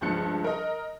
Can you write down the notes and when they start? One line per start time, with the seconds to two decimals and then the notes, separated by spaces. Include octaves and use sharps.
0.01 C#2 G2 F3 A5 F#6 C#7
0.44 A#4 D#5